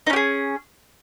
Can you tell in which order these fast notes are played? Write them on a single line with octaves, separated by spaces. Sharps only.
D#4 C#4 G4 G#4